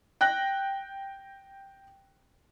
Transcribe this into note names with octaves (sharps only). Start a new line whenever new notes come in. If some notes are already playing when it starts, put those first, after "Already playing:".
G5 F#6 A#6